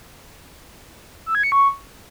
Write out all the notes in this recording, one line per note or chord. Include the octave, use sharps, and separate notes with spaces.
E6
G#6
C#7
C#6